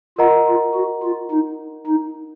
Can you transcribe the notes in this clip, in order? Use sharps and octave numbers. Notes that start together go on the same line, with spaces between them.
F4 A#4 D#5 F#5 A#5
F4
F#4
F4
D#4
D#4